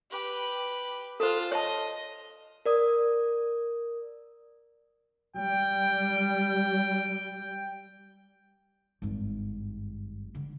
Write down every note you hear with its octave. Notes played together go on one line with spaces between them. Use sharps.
G4 B4
F4 A4 C5 A5
C#5 D#5 A5
A#4 D5 D#6
G3 G5
G#1 G2
D3